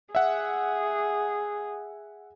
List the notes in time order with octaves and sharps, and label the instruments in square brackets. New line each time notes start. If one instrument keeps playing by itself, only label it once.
[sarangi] G#4 [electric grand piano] E5 F#5